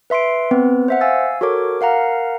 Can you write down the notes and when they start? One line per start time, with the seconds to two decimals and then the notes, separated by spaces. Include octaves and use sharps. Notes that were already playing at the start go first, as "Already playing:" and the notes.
0.10 B4 E5 C6 C7 D7
0.51 B3 C4 B4
0.88 C5 E5 F#5
1.01 F5 G#5 E6 A6
1.41 F#4 A4 A#4 C#5 D6
1.81 A#4 F5 F#5 A#5